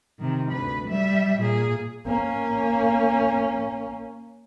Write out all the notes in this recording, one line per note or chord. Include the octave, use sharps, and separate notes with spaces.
C3 D#3
D2 B4
G3 E5
A#2 G#4
A#3 C#4